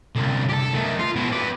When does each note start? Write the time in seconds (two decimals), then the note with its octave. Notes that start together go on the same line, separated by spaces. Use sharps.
0.16 C2 D3
0.49 G4 A4
0.74 D#3 A3
1.00 F4
1.16 B2 E4
1.32 B4 D5